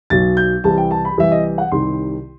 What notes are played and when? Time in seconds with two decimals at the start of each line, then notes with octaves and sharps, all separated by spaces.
0.10 B1 B2 F#3 A6
0.37 G6
0.64 C2 C3 E3 A5
0.78 G5
0.91 A5
1.05 B5
1.18 C2 C3 E3 E5
1.32 D#5
1.58 F#5
1.72 C2 C3 D#3 C6